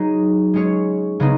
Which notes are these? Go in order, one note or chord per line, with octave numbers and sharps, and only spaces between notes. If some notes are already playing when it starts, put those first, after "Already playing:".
Already playing: F#3 D#4 G#4
G#3 C#4 G#4 C#5
C#3 G#3 B3 D#4